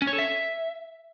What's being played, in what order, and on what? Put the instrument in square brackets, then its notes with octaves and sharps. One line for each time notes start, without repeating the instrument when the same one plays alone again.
[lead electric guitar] C#4
C#5
A4
E5